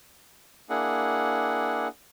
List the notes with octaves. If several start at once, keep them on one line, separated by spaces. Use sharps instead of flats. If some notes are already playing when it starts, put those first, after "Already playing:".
A#3 D4 E4 G#4 F#5